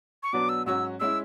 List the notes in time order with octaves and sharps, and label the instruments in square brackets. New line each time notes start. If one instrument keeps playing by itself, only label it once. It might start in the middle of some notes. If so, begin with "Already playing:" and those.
[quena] C#6
[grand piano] B2 F#3 B3 D4 [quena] D6
[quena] E6
[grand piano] G#2 F#3 C#4 F#4 [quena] E6
[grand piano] G#3 C#4 E4 [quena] E6